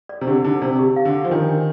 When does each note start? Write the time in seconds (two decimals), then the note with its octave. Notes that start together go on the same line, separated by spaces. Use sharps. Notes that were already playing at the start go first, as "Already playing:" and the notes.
0.09 D5
0.21 C3
0.27 D3 G4
0.44 D3 D#4
0.61 C3 D5
0.79 G4
0.96 F5
1.05 D3
1.13 F5
1.24 F3
1.31 D#3 D4
1.48 D4